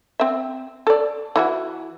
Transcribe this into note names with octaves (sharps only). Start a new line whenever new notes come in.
C4 E5
A4 D5
E3 E4 F#4